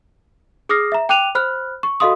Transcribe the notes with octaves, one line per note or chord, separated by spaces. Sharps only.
G#4 D6 D#6 F6 A#6 C7
E5 A#5
G5 D6 F#6 D#7 F7
C5 B5 F6 F#6
C#6
F#4 A4 D#5 F5 C6 D#6